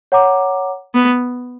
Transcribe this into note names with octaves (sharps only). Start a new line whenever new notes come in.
C#5 F#5 A#5 D6
B3